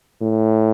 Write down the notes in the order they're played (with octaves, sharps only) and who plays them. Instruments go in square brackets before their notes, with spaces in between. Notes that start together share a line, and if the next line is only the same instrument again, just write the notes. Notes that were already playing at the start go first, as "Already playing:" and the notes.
[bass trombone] A2